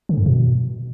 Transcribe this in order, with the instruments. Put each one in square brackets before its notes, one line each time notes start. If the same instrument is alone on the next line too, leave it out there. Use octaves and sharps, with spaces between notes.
[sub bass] D3
F#2
B2